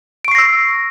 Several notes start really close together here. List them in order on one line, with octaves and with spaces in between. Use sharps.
D7 C#6 C7 A#6 E6